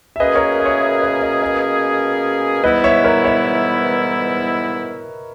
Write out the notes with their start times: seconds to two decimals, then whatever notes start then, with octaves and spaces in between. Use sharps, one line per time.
0.16 E5
0.20 B2 A#3 C#4 G#4 B4 D#5
0.35 A#4 C#5
0.59 D#5
0.65 C#5 E5
0.81 C#5 E5
1.01 B4 D#5
1.21 B4 D#5
1.42 B4 D#5
2.63 G#2 E3 G3 B3 E4 B4 D#5
2.84 C#5 E5
3.04 A#4 C#5
3.24 C#5 E5